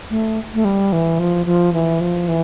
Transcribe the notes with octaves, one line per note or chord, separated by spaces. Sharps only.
A3
A3
G3
E3
F3
F3
E3
F3
E3